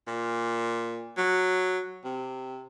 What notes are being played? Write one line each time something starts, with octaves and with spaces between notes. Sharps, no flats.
A#2
F#3
C3